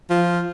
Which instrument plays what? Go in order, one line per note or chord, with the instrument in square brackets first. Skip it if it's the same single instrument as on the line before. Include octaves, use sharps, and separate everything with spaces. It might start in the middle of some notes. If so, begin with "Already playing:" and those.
[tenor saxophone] F3